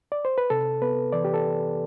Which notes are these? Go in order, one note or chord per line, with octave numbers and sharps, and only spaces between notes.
D5
C5
B4
C3 A4
B3 B4
E3 D5
G4
A4